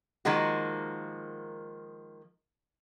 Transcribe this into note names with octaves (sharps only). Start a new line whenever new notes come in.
D#3 F3 G#3 A#3 F#4